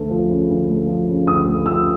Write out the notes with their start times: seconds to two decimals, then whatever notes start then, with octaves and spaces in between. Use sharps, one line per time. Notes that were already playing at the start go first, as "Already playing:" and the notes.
Already playing: D2 A3
0.09 F3
0.29 C#3
0.49 D2
0.69 A3
0.87 F3
1.07 C#3
1.26 D2 D#6
1.47 A3
1.66 F3 E6